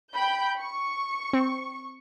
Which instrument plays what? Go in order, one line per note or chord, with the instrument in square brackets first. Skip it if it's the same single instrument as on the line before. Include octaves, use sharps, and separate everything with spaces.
[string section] G5 B5 G6
C#6
[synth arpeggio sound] C4